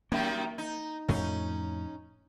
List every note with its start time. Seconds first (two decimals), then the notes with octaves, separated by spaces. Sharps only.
0.12 F#2 D#3 G3 A#3
0.58 D#4
1.08 F2 A2 C#4 D#4